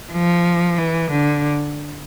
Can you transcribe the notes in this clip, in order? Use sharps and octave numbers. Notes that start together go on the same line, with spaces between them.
F3
E3
D3